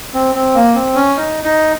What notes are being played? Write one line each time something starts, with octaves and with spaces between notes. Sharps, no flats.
C4
C4
A#3
C4
C#4
D#4
D#4